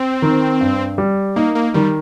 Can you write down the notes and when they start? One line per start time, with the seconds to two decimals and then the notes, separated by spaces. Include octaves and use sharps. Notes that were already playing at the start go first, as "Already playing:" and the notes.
Already playing: C4
0.22 D#3
0.61 G2
0.98 G3
1.36 A#3 D#4
1.55 A#3
1.74 D#3 G3